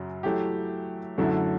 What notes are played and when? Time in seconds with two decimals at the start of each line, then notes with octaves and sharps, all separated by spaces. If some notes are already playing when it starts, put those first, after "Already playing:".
Already playing: F#2 C#3 F#3
0.23 F#3 A3 E4 G4
1.18 F#2 D3 F#3 A3 E4